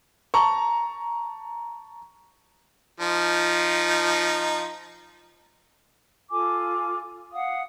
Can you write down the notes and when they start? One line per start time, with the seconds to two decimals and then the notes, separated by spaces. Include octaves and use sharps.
0.34 A5 A#5 C#6
3.00 F3 D#4
6.31 F4 A4 G#5 D6
7.33 F5 F#5 D#6